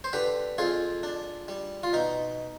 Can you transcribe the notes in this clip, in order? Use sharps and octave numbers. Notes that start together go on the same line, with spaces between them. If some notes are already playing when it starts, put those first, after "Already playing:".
C5
D3 G4 B4
F2 F4 G#4
D4
G3
F4
B2 D#4